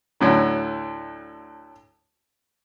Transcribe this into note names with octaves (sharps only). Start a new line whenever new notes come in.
D2 A2 F#3